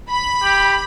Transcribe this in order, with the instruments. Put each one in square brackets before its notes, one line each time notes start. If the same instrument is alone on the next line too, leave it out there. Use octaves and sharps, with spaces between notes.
[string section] B5
[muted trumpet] G4